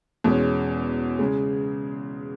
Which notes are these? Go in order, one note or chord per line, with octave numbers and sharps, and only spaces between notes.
E2 B2 G#3 C#4
C#3 G#3